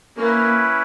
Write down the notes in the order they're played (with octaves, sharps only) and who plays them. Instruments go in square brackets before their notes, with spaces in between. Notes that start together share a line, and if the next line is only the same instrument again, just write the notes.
[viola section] A#3 [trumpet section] C#4 E4 B4